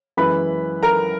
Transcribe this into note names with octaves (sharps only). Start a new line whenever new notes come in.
F#2 E3 G#3 B4 B5
A#4 A#5